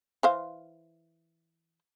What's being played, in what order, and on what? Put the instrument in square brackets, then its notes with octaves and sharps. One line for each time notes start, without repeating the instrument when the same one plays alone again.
[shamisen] E3 C5 F5